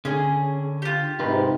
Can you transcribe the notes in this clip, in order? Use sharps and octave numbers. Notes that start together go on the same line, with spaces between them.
D3 C#4 G#4
F4 G4
G#2 C3 D#4 A#4 B4